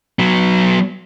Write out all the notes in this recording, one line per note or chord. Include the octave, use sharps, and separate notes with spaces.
F#3 B3